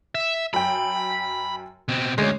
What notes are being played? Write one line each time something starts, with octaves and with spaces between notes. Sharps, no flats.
E5
F#2 G5 B5
B2 C4
D2 G#3 C#4